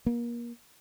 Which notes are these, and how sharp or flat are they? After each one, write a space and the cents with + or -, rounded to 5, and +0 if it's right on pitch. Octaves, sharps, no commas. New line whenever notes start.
A#3 +30